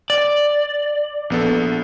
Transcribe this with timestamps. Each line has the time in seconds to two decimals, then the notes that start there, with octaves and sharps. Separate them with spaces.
0.10 D5
1.30 A#1 B3 A4